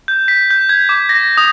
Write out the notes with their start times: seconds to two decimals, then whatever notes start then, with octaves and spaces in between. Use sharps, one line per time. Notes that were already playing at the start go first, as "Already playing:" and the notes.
0.08 G6
0.28 B6
0.50 G6
0.69 G#6
0.89 D6
1.09 A#6
1.38 D#6